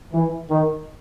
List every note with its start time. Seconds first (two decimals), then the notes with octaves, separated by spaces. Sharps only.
0.13 E3
0.50 D#3